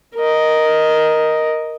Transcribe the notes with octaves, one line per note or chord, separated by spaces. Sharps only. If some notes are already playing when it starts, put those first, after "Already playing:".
A#4 D#5